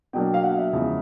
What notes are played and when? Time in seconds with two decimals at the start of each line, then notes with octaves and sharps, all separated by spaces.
0.13 B2 F#3 A#3 D4 G5
0.34 F5
0.43 F#5
0.58 E5
0.72 E2 C#3 F3 G#3